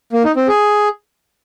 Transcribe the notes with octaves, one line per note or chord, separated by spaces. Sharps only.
A#3
D#4
C4
G#4